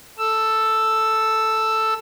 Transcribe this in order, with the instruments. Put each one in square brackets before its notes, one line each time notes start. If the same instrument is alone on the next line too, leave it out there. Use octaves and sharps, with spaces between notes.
[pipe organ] A4 E6